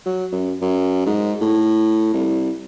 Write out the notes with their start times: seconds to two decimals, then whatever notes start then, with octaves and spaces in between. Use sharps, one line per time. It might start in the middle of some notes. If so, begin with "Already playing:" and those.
0.06 F#3
0.32 F#2
0.62 F#2
1.07 G#2
1.41 A2
2.14 C2